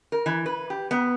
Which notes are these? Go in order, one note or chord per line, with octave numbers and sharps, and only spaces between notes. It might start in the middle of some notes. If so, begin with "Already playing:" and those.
A#4
E3
B4
G4
B3